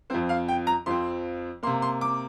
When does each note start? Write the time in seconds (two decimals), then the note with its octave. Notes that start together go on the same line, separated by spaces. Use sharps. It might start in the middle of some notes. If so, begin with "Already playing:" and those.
0.10 F2 F3 C4 C5
0.29 F5
0.48 G5
0.67 A#5
0.86 F2 F3 C4 C6
1.63 A#3 C6
1.67 C3
1.82 C6
2.01 D6